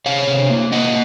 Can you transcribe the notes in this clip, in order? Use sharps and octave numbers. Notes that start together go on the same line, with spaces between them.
C3 C#5 F5
C3
A#3
A#3 D#5 F#5